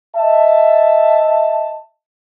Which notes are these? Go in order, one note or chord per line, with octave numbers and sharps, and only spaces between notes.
D#5 E5 A5